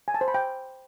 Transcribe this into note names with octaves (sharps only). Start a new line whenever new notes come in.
G#5
A5
C5
B5
G5